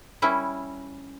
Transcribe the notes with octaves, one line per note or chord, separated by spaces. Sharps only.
G3 C#4 E4